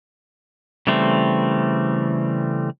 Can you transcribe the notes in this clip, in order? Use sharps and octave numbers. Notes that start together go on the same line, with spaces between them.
C#3 E3 G3 A3 C4